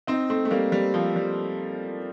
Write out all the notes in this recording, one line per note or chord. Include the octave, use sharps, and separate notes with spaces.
C4 D#4
A3 C4
A3
G3 A#3
G3
F3
G3